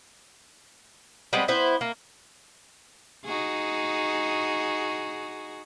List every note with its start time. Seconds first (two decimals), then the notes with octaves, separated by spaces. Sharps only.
1.33 G3 G#3 B3 C4
1.48 B3 E4 C5
1.81 A#3
3.25 D#4 F#4 G#4